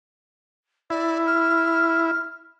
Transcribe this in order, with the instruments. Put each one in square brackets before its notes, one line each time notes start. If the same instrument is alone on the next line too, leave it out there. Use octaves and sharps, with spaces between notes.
[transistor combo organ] E4 [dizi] D5
[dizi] F6